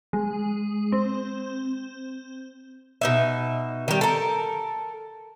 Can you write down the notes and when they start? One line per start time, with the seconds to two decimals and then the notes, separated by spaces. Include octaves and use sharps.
0.13 G#3
0.92 C4
3.01 B2 D#4 E5
3.88 D#3 G3
4.01 A4 A#4